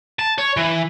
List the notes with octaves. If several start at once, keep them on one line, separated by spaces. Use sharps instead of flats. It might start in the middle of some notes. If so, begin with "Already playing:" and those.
A5
C#5
E3